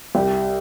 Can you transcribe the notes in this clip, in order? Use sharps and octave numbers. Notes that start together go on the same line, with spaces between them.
C2 G4